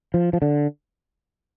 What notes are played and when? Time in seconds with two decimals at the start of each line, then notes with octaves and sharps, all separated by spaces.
0.14 F3
0.33 F3
0.42 D3